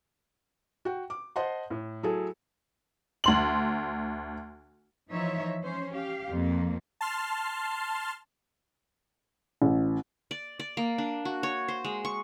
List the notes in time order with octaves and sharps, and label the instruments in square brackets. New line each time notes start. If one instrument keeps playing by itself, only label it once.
[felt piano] F#4 G5
D6
C5 D#5 F#5 A5 C6
A2
F#3 A3 E4 G#4 A4
[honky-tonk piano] D2 C6 F#7
[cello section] E3 F3 D#4 C#5 E5
C#4 C5
G4 F5
F2 A#3
[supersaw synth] A5 C6 F6
[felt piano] A1
[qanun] D5
D5
A#3
D4
F#4
C#5
C5
G#3
C#6